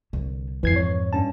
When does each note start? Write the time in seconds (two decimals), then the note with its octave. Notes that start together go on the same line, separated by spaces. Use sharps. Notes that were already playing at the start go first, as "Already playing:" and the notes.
0.13 C2 D3
0.63 F2 G#2 E3 G#6 C7
0.76 C#5
1.13 G2 C#4 A5